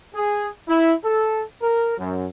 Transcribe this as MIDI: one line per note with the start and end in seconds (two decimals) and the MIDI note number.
0.15 0.47 68
0.68 0.93 64
1.04 1.42 69
1.62 1.97 70
1.98 2.26 42